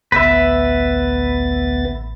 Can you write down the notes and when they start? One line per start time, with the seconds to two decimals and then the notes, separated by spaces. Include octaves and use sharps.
0.12 A1 D2 B3 B4 E5 A6